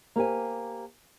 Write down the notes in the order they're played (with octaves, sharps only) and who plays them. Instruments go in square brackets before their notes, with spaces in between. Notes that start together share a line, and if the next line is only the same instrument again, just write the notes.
[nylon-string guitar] A#3 G4 C5 G#5